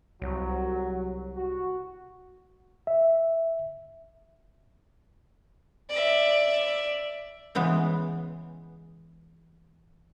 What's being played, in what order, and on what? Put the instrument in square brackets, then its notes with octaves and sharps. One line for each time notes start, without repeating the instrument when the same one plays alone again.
[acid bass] C2 [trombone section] F#3
[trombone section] F#4
[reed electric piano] E5
[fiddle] D5 E5
[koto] C#3 E3 G#3 B3